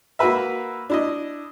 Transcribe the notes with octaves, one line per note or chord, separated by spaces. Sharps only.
A#3 F#4 A#4 B4 E5
D4 E4 D#5